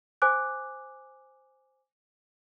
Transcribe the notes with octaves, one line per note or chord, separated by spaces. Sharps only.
C5 G#5 D6 F#6